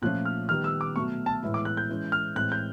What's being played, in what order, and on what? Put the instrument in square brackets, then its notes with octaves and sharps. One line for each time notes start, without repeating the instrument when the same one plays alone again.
[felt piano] A#2 F3 A3 C#4 F4 [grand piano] F#6
[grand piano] F6
[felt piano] D#3 G3 B3 [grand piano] F6
[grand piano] E6
D6
[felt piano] B2 F#3 A3 [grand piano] C#6
[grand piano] A5
[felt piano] A2 E3 G#3 B3 E4
[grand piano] D6
F#6
G6
[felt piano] E3 G#3 C#4
[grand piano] F6
[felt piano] A2 E3 G#3 C4 [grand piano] F#6
[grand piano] G6